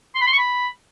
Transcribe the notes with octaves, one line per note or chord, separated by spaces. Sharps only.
C6
B5
C6
C#6
B5